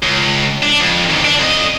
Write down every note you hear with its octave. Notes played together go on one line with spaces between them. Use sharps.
C#2
D4
F2
D#2 C3
D4
F2 D#5